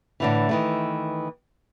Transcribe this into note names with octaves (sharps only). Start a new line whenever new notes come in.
A2 D3 E3
D#3 E3 A3